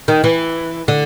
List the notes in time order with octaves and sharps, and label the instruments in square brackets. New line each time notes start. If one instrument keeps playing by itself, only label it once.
[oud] D#3
E3
D3